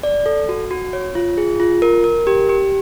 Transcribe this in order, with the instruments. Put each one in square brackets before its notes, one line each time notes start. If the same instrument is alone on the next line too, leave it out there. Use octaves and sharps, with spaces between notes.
[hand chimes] D5
A4
F#4
F#4
C#5
F4
G#4
F4
A#4
A#4
G4
G4